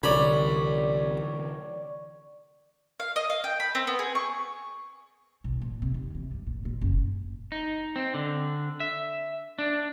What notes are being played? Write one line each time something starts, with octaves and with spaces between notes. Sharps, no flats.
C2 D3 E3 C#5 D5 B5
F5
D#5
F5
G5
B5
C4
B3
G#4
C#6
B1
A#2
C3
D#2
E3
G2
A#2
A#2
F#1
D#4
C4
D3
E5
D4